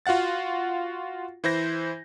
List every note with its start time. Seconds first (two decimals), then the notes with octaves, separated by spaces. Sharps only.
0.06 F4 F#4 F5 F#5 A6
1.44 E3 E4 C5 G6 A#6